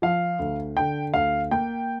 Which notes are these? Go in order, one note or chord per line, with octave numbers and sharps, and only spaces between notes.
F3 F5
D2
D3 G5
D2 F5
A#3 G5